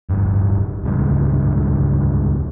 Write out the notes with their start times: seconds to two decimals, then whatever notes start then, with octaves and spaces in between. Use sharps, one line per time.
0.10 D1 G1 G2
0.84 D#1 C#2 G2